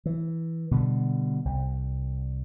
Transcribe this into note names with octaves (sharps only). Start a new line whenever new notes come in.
E3
B2 D3 F#3 G3
C2